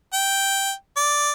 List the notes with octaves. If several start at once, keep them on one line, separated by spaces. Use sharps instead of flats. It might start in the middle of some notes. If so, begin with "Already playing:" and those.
G5
D5